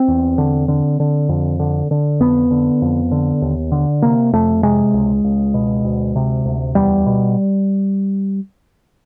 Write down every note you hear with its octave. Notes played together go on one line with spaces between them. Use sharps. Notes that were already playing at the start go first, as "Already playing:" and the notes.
Already playing: C4
E2
D3
D3
D3
F2
D3
D3
F2 B3
D3
F2
D3
D#2
D3
C3 A#3
F2 A3
C3 G#3
C#2
C#2
B2
D2
C3
D2
E2 G3
B2